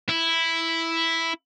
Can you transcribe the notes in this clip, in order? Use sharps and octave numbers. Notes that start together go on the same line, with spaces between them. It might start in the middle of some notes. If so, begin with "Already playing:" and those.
E4